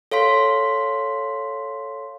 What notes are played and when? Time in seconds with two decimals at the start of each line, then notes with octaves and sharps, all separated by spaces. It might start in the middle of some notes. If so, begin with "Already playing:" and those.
0.12 A4 C#5 F5 C6 B6